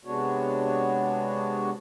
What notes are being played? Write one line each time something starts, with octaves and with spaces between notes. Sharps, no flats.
C3 G#3 B3 D4 F#4 C#5